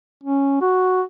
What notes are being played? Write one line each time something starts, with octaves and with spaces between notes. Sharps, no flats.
C#4
F#4